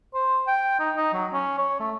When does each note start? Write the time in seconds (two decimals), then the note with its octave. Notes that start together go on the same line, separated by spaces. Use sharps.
0.14 C5
0.47 G5
0.79 D#4
0.96 D#4
1.13 F#3
1.33 C#4
1.58 C#5
1.80 A3